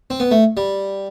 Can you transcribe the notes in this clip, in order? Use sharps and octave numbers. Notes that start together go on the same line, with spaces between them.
C4
B3
A3
G3